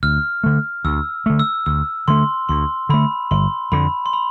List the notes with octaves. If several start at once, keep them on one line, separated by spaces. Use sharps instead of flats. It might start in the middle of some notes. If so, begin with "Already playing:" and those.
D2 F6
D3 A3
D2 E6
D3 A3
E6
D2 E6
D3 A3 C6
D2 C6
D3 A3 B5
G1 C6
F2 D3 B5
C6
B5